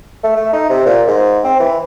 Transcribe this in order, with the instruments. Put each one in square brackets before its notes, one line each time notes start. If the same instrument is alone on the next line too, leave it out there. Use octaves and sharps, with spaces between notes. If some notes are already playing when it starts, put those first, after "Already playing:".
[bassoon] A3
A3
D#4
C3
A#2
G#2
C4
E3